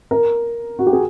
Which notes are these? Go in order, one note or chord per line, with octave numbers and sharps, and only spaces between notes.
A#4
F#4
G4
G#4